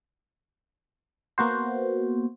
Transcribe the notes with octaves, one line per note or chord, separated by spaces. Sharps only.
A#3 B3 F#4 C5